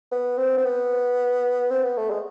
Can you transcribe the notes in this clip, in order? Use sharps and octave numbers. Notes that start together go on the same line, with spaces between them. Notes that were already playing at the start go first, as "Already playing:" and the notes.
B3
C4
C4
B3
C4
B3
A3
G#3